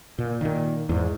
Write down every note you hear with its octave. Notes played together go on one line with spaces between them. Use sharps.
A#2
A#2 D#3
E2 G#2